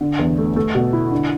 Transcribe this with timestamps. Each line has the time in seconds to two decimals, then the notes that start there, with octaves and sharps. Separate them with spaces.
0.01 D3
0.19 E2
0.38 A3
0.56 A3
0.75 B2
0.93 E4
1.11 D3